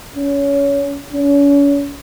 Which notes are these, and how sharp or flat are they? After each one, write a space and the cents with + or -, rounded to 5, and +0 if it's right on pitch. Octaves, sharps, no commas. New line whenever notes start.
C#4 +20
C#4 +40